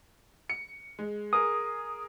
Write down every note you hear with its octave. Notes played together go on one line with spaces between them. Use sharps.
C#7
G#3
G#4 A#4 D#6